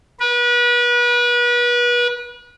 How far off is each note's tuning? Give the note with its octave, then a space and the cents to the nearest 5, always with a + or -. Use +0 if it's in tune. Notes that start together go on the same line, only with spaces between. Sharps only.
B4 -35